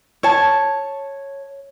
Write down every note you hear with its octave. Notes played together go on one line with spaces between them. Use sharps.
C#5 A5